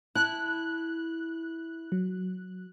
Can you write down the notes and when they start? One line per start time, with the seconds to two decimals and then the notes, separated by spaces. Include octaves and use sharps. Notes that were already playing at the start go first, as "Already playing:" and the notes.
0.15 E4 A5 F#6
1.92 F#3